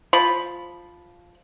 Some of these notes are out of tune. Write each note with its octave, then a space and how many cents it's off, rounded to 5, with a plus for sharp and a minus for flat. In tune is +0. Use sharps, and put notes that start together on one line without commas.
F3 +0 B5 +0